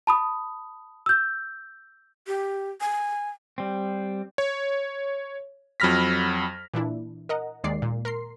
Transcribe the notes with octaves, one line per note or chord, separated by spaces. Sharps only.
A5 B5 D#6
E6 G6
G4
G#5
G3 C4
C#5
F2 F#3 B5 F6 A#6 B6
A#2 E3 D4 E4
A#4 D#5 F#5 A#5
D#2 D#3 G#3 D5 C7
A#2
A#4 A#5 C6 C7